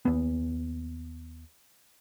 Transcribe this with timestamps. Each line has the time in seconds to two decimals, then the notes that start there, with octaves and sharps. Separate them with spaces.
0.05 D#2 B3